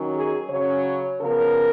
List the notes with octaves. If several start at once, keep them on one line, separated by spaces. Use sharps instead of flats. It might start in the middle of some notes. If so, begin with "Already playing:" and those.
Already playing: D#3 F#3 C#4
G#4
C#3 F#3 C#4 C#5
C#3 F3 B3 A#4